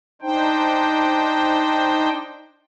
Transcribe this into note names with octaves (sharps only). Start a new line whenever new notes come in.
D4 D#4 C5 G5